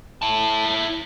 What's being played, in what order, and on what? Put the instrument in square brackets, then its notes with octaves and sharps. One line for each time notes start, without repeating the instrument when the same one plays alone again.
[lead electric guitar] E4 A5